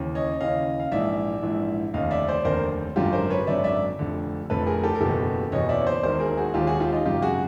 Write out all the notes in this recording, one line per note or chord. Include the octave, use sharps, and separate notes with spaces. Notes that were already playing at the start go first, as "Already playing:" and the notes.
Already playing: D#2 C#3 E3
C#5 D#5
D#2 C#3 E3 D#5 F5
F5
A#1 G#2 E3 D5 E5
A#1 G#2 E3
F1 D#2 D3 D#5 F5
D5 E5
C5 D5
F1 D#2 D3 A#4 C5
G#1 F#2 D3 F4 G4
A#4 C5
B4 C#5
G#1 F#2 D3 D5 E5
D5 E5
F1 F2 D3
F1 F2 D3 A4 B4
G#4 A#4
G4 A4
A#4
F#1 E2 B2 G4 A4
F#1 E2 B2 C#5 D#5
D5 E5
C#5
C5 D5
E1 D#2 D#3 A#4 C5
G#4 A#4
F#4 G#4
E1 D#2 D#3 F4 G4
F#4 G#4
F4 G4
D#4 F4
G#1 F#2 C#3 F4 G4
F#4 G#4